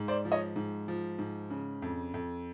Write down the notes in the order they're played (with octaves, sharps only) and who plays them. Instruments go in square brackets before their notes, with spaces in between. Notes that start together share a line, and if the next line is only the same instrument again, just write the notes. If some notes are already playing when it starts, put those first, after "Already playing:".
Already playing: [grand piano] G#2
C5 D5
F3
C#5 D#5
G#2
F3
G#2
C#3
F2
F2